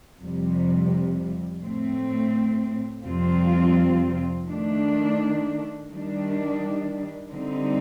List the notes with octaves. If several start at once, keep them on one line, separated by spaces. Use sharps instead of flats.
F2 C3 G3
A2 A3 C4
F2 C3 G3 C4 F4
D#3 A3 D4
D#3 G3 D4
D3 G3 C4 D#4